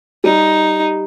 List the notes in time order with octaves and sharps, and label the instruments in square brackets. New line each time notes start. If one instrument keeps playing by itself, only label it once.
[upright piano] G3 [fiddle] D#4